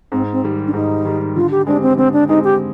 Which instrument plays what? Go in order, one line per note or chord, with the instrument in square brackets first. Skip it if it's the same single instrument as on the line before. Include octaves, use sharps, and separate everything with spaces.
[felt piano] G#2 [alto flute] C4
[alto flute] C4
[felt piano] D#3 G3
[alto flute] D4
[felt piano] G#2 [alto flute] D#4
[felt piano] D#3 G3
[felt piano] D3 [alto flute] F4
[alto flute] G4
[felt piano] G#3 C4 G4 [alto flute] D4
[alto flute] C4
[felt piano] D3 [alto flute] C4
[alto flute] D4
[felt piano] G#3 C4 G4 [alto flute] D#4
[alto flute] G4